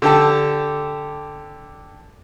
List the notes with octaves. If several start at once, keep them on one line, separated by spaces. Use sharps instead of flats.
D3 G4 A4